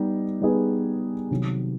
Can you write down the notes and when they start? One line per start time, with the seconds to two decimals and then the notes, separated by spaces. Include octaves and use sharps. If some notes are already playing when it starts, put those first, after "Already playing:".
Already playing: G3 B3 D#4
0.41 G3 B3 D#4 G#4 B4
1.31 C3 D#3 F#3